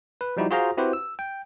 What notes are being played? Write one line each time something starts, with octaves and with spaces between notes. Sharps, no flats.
B4
F3 G3 D#4 E4 F#4 G4
F4 F#4 G#4 C5 F5 A#5
C4 E4 F#4 G4 B4 C5
E6
G5